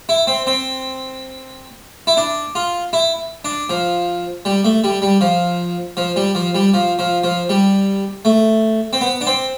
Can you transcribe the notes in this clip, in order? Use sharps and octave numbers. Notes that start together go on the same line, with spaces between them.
E4
C4
C4
E4
D4
F4
E4
D4
F3
G3
A3
G3
G3
F3
F3
G3
F3
G3
F3
F3
F3
G3
A3
C4
B3
D4
C4